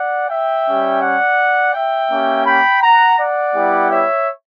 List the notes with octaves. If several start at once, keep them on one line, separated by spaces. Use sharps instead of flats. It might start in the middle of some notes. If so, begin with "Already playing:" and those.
Already playing: D5 F#5
E5 G5
G3 C#4 G4
D5 F#5
E5 G5
A#3 C#4 G4
G5 B5
F#5 A#5
D5 F#5
G3 B3 E4 G4
C#5 E5